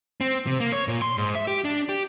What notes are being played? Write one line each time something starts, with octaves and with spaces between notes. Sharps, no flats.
C4
C3
A#3
C#5
A#2
C6
G#2
E5
G4
D4
G4